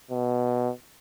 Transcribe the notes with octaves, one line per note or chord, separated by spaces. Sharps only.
B2